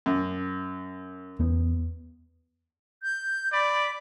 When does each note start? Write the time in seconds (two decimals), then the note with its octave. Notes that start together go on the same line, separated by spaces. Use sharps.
0.06 F#2
1.39 E2 B3
3.03 G6
3.53 D5 B5